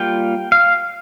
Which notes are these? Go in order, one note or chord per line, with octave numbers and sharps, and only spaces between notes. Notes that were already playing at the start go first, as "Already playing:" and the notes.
Already playing: G3 A#3 F4 G5
F5